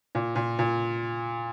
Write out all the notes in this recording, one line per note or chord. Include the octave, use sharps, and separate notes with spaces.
A#2
A#2
A#2